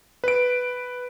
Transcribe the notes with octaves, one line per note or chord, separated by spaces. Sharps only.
B4 D7